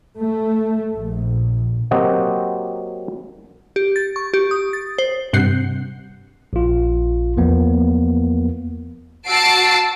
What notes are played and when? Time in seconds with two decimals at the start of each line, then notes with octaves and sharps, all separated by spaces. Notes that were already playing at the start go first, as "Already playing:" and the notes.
0.19 A3
0.95 A#1
1.91 F#3 A#3 C4 F#4 G4 D#5
3.76 G4
3.96 A6
4.16 C#6
4.34 G4
4.51 D#6
4.73 A6
4.98 C5
5.33 G2 C3 F#5 G6 C7
6.53 A#1 F4
7.37 E2 F3 A#3 B3
9.27 F#4 A5 E6 C7 D7